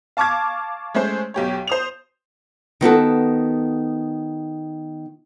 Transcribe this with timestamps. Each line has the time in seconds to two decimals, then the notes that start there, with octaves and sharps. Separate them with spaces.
0.17 F5 A5 C#6 D6 F6 G#6
0.94 G#3 A3 C#4 C5
1.34 B1 G4 C#5
1.68 C5 D#6 F7
2.81 D#3 B3 F#4 A4